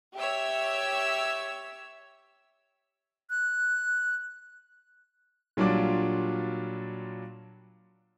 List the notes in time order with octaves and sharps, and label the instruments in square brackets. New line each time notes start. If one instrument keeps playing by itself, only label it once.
[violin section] G4 C#5 E5 E6
[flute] F#6
[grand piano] A#2 F#3 G3 D4 F4 D6